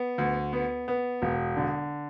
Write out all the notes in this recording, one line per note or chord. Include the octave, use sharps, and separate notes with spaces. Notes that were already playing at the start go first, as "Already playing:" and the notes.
Already playing: B3
D2
B3
B3
E1
D3